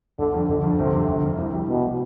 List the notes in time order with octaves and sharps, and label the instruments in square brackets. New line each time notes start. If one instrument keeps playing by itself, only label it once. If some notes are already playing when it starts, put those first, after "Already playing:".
[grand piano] G1 [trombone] D3
[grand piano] F2 D3
[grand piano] G1 [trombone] D3
[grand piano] F2 D3
[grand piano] G1 [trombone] C3
[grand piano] F2 D3
G1
F2 D3
C2
C3 G3
[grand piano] C2 [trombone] B2
[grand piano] C3 G3